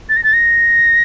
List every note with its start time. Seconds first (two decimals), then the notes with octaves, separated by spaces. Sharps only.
0.09 A6
0.17 A#6
0.24 A6
0.33 A#6